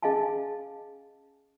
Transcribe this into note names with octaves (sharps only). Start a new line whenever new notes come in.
C#4 G#4 D#5 F5 G#5 A5